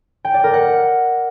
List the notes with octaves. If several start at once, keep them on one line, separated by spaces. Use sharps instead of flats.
G5
D5
A#4
F#5